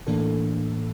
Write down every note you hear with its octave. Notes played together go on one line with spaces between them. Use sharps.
A2 E3 A#3 D4 A4